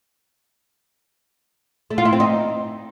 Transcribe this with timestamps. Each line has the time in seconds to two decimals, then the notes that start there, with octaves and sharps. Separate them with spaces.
1.90 A3
1.98 F4
2.05 E4
2.13 C4
2.20 D#4